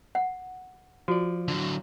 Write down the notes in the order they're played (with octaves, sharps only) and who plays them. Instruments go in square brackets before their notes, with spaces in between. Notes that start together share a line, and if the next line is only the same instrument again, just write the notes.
[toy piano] F#5
[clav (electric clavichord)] F3 D5 [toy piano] F#4
[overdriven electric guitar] D3 F#3